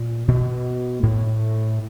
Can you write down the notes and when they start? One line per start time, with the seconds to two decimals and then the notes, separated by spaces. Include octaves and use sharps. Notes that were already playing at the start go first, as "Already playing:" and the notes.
Already playing: A#2
0.28 B2
1.03 A2